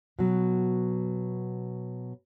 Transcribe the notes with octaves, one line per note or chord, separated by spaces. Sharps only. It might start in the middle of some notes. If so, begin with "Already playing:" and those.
B2 F#3